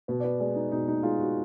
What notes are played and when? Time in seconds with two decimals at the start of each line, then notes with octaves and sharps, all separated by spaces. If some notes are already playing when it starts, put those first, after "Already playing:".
0.08 B2 B4
0.20 D5
0.24 B4
0.40 G#3 D5
0.56 D#4
0.72 B2 D#4
0.88 D#4
1.03 G#3 F4
1.20 F#4